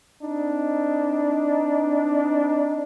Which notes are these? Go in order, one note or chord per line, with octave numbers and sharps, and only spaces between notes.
C4 D4 D#4